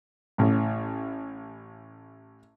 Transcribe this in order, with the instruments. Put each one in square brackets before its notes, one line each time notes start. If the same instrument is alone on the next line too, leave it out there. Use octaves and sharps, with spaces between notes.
[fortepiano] A1 A2